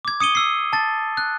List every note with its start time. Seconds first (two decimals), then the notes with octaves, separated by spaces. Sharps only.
0.05 D6 G#6
0.20 D#6 C#7 D#7 G7
0.35 E6 C7
0.73 A5 A6
1.17 F#6